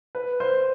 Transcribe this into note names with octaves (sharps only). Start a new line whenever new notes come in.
B4
C5